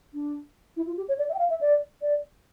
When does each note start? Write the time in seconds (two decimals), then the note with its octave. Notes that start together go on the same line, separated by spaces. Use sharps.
0.14 D4
0.77 E4
0.87 F4
0.97 G4
1.09 C#5
1.19 D5
1.29 E5
1.34 G5
1.39 F5
1.50 E5
1.61 D5
2.02 D5